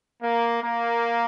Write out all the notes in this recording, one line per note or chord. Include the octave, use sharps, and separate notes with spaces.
A#3
A#3